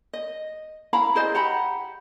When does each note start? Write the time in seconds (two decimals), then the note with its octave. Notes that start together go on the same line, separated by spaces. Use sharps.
0.13 D#5
0.93 E4 F5 A#5 B5
1.15 E4 G#4 C5 D#5
1.35 G4 F#5 A#5 B5